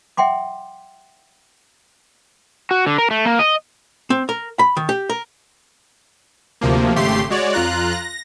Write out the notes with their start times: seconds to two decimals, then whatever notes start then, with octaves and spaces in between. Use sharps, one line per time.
0.17 E5 F#5 G5 C6 D6
2.71 F#4
2.87 D3
2.98 A#4
3.11 A3
3.26 A#3
3.39 D#5
4.10 C4
4.29 A#4
4.59 B5
4.77 D#3
4.89 G4
5.10 A#4
6.61 D2 C3 F3 A#3
6.96 G#1 C#3 A3 G4 C6 C7
7.30 G#3 F#4 C#5 D5
7.53 F2 F4 A#5 F#6
7.93 A#6